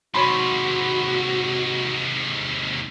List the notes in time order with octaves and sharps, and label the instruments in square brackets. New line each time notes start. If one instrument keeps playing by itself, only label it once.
[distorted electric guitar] G#2 C3 [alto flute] F#4 [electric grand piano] C#5 B5 C6